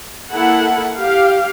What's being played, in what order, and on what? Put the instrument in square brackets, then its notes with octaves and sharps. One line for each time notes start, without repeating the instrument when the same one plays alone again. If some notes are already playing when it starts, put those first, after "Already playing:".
[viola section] A#3 E4 A4 F#5
G4 F5